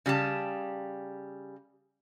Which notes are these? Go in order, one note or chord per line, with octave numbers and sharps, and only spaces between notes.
C#3 G3 G4 A5